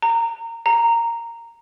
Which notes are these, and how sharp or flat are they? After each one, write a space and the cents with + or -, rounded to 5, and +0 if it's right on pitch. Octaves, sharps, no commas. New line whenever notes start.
A#5 -20
A#5 -10